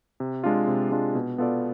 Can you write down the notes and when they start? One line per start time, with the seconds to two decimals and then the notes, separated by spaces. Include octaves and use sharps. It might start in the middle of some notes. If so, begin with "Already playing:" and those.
0.20 C3
0.44 G#3 D4 F4
0.68 C3
0.91 G#3 D4 F4
1.15 B2
1.38 B3 F4 A4 D5